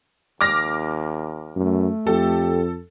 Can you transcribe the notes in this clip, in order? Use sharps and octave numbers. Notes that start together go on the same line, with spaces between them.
D#2 D6 F6 A#6
F#2 A3
F2 G4 A4